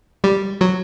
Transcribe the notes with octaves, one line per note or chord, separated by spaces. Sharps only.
G3
F#3